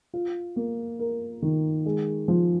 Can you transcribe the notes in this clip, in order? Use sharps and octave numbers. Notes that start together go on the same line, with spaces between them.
F4
A#3
A#4
D#3
G#3
F3